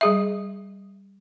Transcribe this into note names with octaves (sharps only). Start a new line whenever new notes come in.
G3 G#4 E5